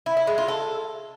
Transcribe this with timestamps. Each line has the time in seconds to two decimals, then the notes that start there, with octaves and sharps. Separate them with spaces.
0.06 E4
0.17 E4
0.27 G#3
0.38 F4
0.48 A4